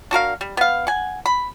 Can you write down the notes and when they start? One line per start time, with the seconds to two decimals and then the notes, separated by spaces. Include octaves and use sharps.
0.11 D4 F#4 A#4 F5
0.41 G3
0.57 B3 F5
0.87 F#5 G#5
1.26 B5